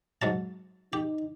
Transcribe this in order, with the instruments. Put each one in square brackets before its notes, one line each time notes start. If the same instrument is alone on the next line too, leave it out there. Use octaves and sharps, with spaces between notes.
[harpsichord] G#2 F#3 A5
[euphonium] D#4 [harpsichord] G4